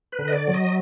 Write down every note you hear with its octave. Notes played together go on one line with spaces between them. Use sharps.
B4
D3
D#5
D5
F#3
D#5